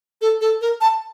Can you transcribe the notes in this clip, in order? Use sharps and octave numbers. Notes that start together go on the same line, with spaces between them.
A4
A4
A#4
A5